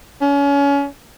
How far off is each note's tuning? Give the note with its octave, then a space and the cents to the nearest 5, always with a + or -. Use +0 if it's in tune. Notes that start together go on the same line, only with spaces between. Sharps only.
C#4 +30